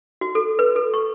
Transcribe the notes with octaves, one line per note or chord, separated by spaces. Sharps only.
F#4
A4
B4
A4
C#6